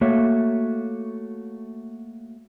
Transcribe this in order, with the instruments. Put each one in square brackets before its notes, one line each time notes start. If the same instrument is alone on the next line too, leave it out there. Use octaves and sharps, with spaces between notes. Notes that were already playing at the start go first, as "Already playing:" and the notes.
[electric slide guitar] A3 A#3 F#4 C#5 E5